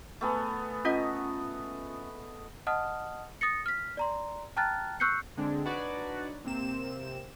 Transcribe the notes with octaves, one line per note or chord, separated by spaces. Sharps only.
A3 B3 G#4
C#4 F4 D#5 F#5
D#5 F#5 A5 D#6 F6
D#6 A6 A#6 C#7
F6 B6
D5 A#5 C6
G5 A5 A#5 F6 F#6 A6
C#6 E6 F#6 G6 C7 C#7
D3 G#3 C4 D4
D4 D#4 F#4 B4 C#5 D5
C3 A#3 C4 E7